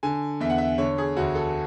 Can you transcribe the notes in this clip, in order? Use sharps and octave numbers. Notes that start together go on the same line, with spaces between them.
D3 G#5
E2 E5
F#5
E5
D3 C#5
G#4
D2 F#4
A4